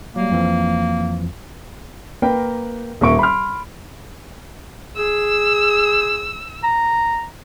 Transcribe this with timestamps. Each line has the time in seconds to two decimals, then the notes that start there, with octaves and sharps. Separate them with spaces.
0.16 F#3 G3 A#3
0.32 F2 E3 F3
2.22 A#3 A#4 B4 G5
3.01 D#1 A#3 E5 C#6 D7
3.19 B5 C6 F6
4.97 G#4 E6
6.63 A#5